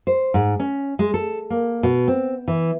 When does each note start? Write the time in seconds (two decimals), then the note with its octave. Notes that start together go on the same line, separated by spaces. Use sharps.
0.07 C5
0.34 G#2
0.60 C#4
0.99 G#3
1.14 A4
1.50 A#3
1.83 B2
2.08 C4
2.48 E3